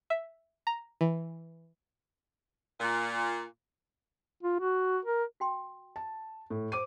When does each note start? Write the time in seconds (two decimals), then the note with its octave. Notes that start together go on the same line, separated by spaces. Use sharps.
0.10 E5
0.67 A#5
1.01 E3
2.80 A#2
4.43 F4
4.60 F#4
5.05 A#4
5.40 F#4 G5 C6
5.96 A5
6.50 A2
6.72 C5 D6 D#7